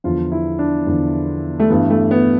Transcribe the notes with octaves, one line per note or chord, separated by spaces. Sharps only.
E2 D3 F3 F4
E4
D4
E2 D3 F3
A3
G2 E3 B3
A3
B3